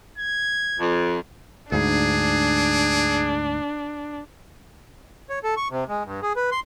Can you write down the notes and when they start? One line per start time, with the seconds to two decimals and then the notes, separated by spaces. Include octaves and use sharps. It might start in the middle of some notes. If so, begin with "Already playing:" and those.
0.18 G#6
0.79 F2
1.72 D2 G#2 D4 G#4
5.30 C#5
5.44 A4
5.57 C#6
5.70 C3
5.89 G#3
6.05 G2
6.22 G#4
6.36 B4
6.52 C6